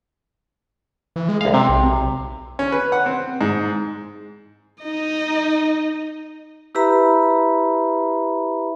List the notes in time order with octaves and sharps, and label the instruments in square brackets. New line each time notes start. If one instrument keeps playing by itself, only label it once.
[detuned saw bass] E3
G#3
[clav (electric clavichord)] C2 F5 [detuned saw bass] G#3
[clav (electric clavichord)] C3 [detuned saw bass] C4
[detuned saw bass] B1
[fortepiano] C#4
B4
F#5
C4
G#2
[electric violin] D#4 D#5
[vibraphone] E4 G4 B4 E5 A#5 B5